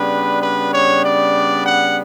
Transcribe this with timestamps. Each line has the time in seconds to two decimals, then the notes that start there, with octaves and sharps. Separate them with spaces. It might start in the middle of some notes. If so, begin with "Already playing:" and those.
Already playing: C#3 G3 B3 D4 B4
0.42 B4
0.73 C#5
1.05 D5
1.66 F#5